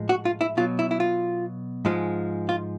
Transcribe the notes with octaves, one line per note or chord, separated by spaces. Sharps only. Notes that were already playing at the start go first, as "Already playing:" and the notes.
Already playing: A2 F3 G#3
F#4
F4
E4
B2 F#3 F4
E4
E4
F4
G#2 F3 G#3
F4